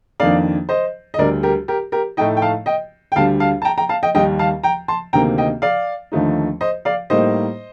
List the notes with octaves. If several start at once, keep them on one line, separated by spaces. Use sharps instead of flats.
F2 D#3 A#3 D4 D5 F5
C5 D#5
D#5
D2 D3 G3 A#4 D5
G4 A#4
G4 A#4
G4 A#4
A2 A3 D#4 D#5 G5
G5
F5 A5
D#5 G5
G5
D2 D3 G3 F5 A5
F5 A5
A5
G5 A#5
G5 A#5
F5 A5
D#5 G5
D#2 D#3 G3 D#5 G5
F5 A5
G5 A#5
A5 C6
D2 C3 D#3 A#3 G5 A#5
D#5 G5
D5 F5
D#2 D3 F3 A3 D#4
C5 D#5
D5 F5
A2 G3 A#3 D#4 C5 D#5